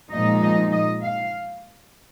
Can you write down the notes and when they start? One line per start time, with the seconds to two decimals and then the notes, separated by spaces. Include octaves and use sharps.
0.11 A#2 F3 G#3 D#4 D#5
0.42 D#5
0.72 D#5
1.01 F5